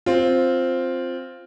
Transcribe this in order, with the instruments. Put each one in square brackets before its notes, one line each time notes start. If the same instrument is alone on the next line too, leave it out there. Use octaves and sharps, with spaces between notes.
[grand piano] C4 F4